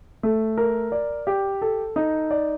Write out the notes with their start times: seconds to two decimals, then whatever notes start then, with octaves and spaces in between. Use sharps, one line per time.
0.23 A3
0.57 A#4
0.92 D5
1.27 G4
1.62 A4
1.96 D#4
2.31 D5